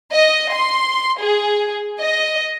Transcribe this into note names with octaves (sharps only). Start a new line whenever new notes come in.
D#5
C6
G#4
D#5